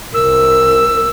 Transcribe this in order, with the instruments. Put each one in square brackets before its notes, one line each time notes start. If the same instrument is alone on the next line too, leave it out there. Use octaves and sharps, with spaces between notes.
[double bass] C2 [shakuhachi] A#4 [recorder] E6